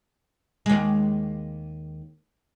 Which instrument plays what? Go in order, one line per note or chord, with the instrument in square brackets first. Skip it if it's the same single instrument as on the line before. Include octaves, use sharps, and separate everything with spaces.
[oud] D#2 G#3